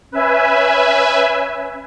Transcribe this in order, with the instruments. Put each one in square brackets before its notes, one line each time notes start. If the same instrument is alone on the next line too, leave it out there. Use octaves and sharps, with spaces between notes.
[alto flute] C#4 [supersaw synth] B4 E5 G#5